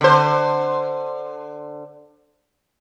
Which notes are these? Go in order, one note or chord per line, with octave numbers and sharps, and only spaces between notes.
D3 C5